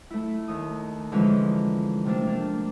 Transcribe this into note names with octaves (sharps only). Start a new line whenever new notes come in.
A3 E4
D#2 D#6
D3 E3 F3 G#3 C#4 D#4
C3 A3 A#3 D4
A#3 D4